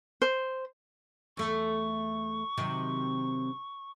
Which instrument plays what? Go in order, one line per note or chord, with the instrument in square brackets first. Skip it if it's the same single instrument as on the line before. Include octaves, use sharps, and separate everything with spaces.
[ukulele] C5
[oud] E2 A3 [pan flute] C#6
[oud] C3 D#3 F#3